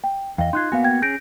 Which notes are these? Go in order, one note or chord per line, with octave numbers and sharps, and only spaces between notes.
G5
E2 D#5 F5 G5
D#4 F4 C6 F#6 G#6
A#3 B3 F#4 F5 G#5
G5 G#6
C#4 G#4 G6 A#6 D7